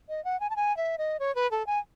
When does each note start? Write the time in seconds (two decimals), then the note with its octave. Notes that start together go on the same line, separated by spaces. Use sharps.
0.09 D#5
0.25 F#5
0.40 G#5
0.50 A5
0.56 G#5
0.77 E5
0.98 D#5
1.20 C#5
1.35 B4
1.51 A4
1.67 G#5